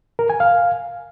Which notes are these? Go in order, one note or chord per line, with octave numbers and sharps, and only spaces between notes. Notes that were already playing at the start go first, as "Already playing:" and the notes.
A#4
G#5
F5